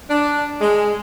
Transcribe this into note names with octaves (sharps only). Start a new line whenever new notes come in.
D4
G#3